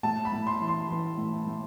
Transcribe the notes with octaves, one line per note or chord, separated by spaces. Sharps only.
A2 A5
B5
A2
C6
E3
C6
E3
A2
A2